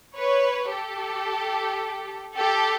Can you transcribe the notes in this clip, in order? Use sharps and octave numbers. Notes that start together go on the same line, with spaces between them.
B4 C#5
G4 A4
G4 A4